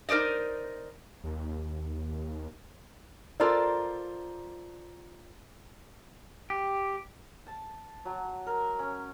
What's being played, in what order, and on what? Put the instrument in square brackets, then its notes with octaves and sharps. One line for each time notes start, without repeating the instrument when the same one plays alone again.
[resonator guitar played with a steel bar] D#4 A#4 C5 D5 D#5
[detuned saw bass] D#2
[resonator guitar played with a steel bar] F4 A4 A#4 C5 D5
[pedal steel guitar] G4
[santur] A5
F#3
A#4
C#4